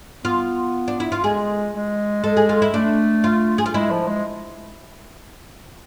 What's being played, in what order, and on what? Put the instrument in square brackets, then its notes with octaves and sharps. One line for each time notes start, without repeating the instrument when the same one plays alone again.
[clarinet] B3 [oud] F4
[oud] D4
E4
F4
[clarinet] G#3 [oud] G#4
[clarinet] G#3
[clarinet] G#3 [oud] A4
[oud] G#4
F4
E4
[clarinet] A3 [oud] D4
[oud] F4
G#4
F4
[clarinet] G#3 [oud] E4
[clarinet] F3
G#3